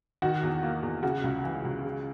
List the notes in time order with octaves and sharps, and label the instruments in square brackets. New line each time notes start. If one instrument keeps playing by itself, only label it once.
[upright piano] D#3 [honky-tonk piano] F#4
[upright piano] E2
A#3
E2
[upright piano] C#3 [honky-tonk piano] F#4
[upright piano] C#2
E3
C#2
C#3